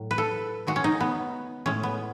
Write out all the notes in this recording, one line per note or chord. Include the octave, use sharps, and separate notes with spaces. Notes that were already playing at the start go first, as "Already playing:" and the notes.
Already playing: A2 F#3
B4
A4
D#3 G#3 F#4
C#4
D#4
B3
A2 G#3 C#4
B3